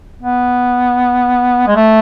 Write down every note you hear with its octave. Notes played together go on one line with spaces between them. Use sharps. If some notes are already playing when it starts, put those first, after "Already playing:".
B3
G#3
A3